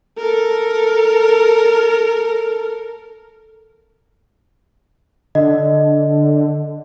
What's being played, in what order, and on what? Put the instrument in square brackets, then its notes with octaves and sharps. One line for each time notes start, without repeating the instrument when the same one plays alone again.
[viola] A4 A#4
[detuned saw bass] D3 [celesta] D#5